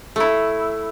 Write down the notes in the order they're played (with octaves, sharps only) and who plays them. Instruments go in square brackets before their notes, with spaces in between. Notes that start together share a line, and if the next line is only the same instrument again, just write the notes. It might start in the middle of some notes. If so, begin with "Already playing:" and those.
[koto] A3 E4